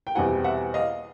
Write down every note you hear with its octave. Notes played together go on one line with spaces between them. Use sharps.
G5
E2 B2 G3 C4 F#5 G#5
E5 F#5
D#5 F5